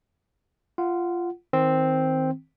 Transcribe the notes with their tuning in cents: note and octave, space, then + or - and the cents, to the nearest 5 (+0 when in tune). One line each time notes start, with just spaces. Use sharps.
F4 -15 F#5 +0
D#3 +25 C4 +0